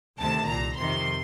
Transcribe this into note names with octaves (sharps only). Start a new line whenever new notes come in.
D2 C3 D#3 A5
C2 A#2 A#5
F2 C3 D#3 C6